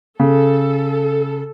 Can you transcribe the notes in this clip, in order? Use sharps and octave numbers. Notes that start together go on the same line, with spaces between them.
C#3 A4